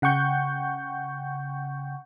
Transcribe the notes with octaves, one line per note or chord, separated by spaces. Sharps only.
C#3 F#5 G5 C#6 G6